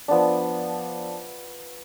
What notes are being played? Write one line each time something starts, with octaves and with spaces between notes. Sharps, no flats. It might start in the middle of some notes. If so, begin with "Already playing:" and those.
F3 B3 D4